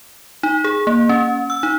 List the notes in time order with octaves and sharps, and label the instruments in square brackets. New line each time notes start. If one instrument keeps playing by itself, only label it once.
[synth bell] D#4
G#4
A#3
C#4
E6
D#4